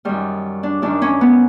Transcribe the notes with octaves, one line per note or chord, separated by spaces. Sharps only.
F#2 D#3 G3
D4
F#2 D#3 D4
C#4
B3